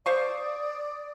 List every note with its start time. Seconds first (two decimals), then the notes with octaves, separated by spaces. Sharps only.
0.06 C5 D5 F5 C#6 D#6